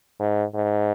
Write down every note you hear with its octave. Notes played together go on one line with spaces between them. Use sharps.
G#2
G#2